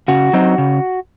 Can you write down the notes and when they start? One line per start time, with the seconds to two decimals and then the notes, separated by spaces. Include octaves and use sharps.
0.08 C#3 F#4
0.33 F#3 C4 D#4
0.58 C#3